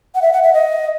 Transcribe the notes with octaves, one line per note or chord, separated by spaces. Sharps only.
F#5
E5
F#5
E5
D#5